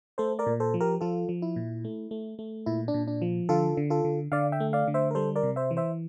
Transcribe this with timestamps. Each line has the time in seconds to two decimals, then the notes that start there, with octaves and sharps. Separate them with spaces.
0.18 A3 A4 C5
0.39 A#4 D5
0.46 A#2
0.60 A4 C5
0.74 F3
0.80 G4 A#4
1.01 F3 F4 A4
1.29 F3
1.42 E4
1.56 A#2
1.85 A3
2.11 A3
2.39 A3
2.66 A#2 E4
2.88 D4
2.94 A#2
3.07 D4
3.22 F3
3.49 D3 F4 A4
3.77 D3
3.90 F4 A4
4.04 D3
4.32 D3 D5 F5
4.52 E5 G5
4.60 A3
4.73 D5 F5
4.88 D3
4.94 C5 E5
5.11 A#4
5.15 G3 A4 C5
5.36 A#4 D5
5.43 C3
5.56 C5 E5
5.71 E3
5.77 C5 E5